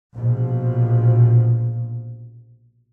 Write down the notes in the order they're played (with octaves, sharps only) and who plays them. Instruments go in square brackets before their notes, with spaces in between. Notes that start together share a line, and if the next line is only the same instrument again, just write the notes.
[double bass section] A#1 B2 F3